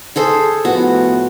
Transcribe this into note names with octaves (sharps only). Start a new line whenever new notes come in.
G#4 A4 C5
A2 F3 B3 F#4